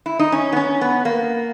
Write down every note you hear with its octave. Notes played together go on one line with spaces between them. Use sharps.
E4
D#4
C#4
B3
C#4
B3
A#3